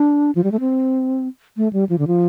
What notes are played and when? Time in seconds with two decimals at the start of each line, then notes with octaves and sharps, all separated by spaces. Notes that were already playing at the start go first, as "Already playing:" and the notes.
Already playing: D4
0.35 F3
0.44 G3
0.52 A3
0.60 C4
1.57 A3
1.73 G3
1.89 F3
1.98 D3
2.07 F3